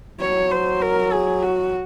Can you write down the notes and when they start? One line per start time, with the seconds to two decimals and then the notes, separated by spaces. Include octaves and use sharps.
0.20 F#3 C#5
0.51 C5
0.82 A#4
1.12 G#4
1.43 F#4